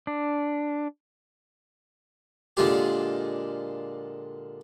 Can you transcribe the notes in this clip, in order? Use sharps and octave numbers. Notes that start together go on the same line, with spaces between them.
D4
A#2 D3 G#3 F4 G4